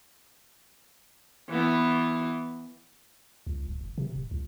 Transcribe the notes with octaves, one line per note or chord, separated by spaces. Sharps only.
E3 B3
C#2
D1
F1
C3
D1
C#2